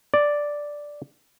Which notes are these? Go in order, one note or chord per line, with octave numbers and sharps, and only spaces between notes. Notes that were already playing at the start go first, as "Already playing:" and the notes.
D5